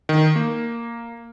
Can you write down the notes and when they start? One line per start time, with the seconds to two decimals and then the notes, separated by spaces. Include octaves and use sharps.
0.09 D#3
0.36 A#3